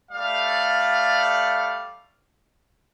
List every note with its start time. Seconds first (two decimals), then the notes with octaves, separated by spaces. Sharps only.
0.10 G3 A3 D5 F5